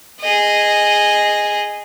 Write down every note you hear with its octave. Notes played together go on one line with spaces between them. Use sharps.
G#4 D#5